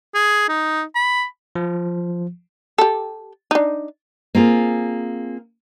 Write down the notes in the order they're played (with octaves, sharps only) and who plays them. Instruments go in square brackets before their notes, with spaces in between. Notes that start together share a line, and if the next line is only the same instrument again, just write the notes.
[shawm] G#4
D#4
B5
[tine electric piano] F3
[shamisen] G4 A4
D4 D#4
[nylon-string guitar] A#3 C4 F4 G#4